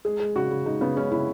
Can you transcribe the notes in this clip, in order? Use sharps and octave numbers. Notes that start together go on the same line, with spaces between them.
G#3 G#4
G#3
C#3 F#4
C#3
G#3 D#4
C#3 B3
G#3 C#4
C#3 E4